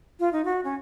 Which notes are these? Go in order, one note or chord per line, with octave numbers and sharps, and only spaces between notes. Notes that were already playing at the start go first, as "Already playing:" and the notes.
F4
D#4
F#4
C#4